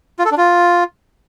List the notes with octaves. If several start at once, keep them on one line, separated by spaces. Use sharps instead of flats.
F4
A4
D4
F4